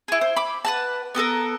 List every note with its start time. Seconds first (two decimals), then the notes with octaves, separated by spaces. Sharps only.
0.08 E4 G#4
0.21 C5
0.36 B5 D6
0.65 B4 F#5 A5
1.15 B3 G4 A4 A#4